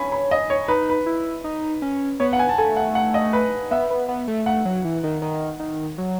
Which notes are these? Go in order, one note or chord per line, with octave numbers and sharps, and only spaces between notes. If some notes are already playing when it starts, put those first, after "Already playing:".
Already playing: C#4 G#5 B5
B5
D#5
C#5
D#4 B4
B4
E4
D#4
C#4
B3 C#5
F#5
G#5
A5
A3 G#5
F#5
F#5
D#5
B4
B3 E5
B3
B3
A3
A3 F#5
F#3
E3
D#3
D#3
D#3
F#3